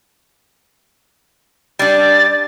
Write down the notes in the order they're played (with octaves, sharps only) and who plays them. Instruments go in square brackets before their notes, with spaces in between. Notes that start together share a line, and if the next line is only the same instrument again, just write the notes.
[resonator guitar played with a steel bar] G3 D4 [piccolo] A6